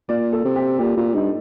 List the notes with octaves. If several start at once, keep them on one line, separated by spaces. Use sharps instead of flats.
A#2 D5
A4
C3
G4
A#2 G4
A#2 F4
G2 D#4